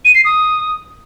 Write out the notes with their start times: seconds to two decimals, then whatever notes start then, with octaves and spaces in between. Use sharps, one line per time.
0.05 D#7
0.15 C7
0.25 D#6